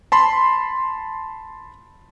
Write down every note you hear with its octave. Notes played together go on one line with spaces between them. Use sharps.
A5 B5 C6